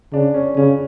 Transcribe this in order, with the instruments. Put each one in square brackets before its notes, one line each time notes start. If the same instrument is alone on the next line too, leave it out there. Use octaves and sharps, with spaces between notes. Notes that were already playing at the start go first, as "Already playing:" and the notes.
[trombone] C#3 [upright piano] D4
[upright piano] C#4
[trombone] C#3 [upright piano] C#4